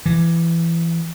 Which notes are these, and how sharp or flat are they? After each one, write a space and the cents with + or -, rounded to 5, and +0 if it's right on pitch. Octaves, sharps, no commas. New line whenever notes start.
E3 +20